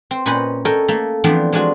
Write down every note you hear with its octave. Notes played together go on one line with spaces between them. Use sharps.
C4
A#2 C#4 B4 C5 D#5 B5
A4 A#4 C#5 D#5 G5
A3 A#3 A4
E3 F3 A3 B3 C4 D4
G#3 D4 F4 F#4 G#4